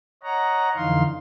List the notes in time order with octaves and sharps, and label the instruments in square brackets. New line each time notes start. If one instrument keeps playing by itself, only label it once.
[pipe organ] C#5 D#5 F#5 A#5
F2 D3 E3 D#4 F5 C6